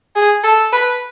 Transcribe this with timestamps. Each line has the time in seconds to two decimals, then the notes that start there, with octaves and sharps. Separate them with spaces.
0.16 G#4
0.44 A4
0.73 B4